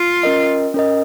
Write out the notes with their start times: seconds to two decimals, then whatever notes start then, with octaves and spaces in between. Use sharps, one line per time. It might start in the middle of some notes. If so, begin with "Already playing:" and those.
Already playing: F4
0.23 C#4 A#4 D#5
0.74 C#4 A#4 D#5